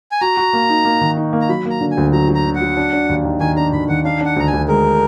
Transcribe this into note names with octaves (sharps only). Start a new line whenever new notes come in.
G#5
F#4 A#5
F#4
A#3
D#4
A#3
D#3
D#4
A#3
A#5
F#3 B5
A#3 A#5
D3
G#5
D2
F#3 A#5
F#3
A#5
D3
F#5
F#3
D4
D4
D#2
D#3
D#3 G#5
D4 A#5
D#3 B5
D#3 F#5
D4 F5
D4 F#5
D2 A#5
G#5
D2
G#3 A#4